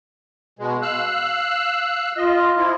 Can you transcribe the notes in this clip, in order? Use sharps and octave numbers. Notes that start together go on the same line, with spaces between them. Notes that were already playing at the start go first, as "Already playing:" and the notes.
B2 G#3
F5 E6 F#6
F4 D#5
F3 E4